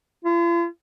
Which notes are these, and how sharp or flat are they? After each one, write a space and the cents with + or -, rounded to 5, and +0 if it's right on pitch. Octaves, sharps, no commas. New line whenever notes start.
F4 -45